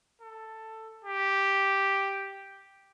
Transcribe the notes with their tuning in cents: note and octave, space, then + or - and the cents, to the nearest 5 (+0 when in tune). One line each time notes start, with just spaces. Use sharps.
A4 +10
G4 +0